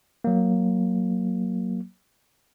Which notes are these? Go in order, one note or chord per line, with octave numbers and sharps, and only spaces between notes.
F#3 A#3